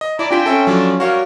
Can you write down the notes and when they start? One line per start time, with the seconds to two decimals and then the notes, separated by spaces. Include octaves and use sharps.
0.01 D#5
0.19 E4 D5 A5 A#5
0.31 C4 D4 F4 G4 G5 G#5 B6
0.46 C#4 A4 E5
0.67 F3 F#3 D4 A4
1.00 G3 F#4 A#4 C#5 F5